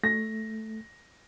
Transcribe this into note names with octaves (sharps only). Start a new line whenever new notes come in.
A3 A#6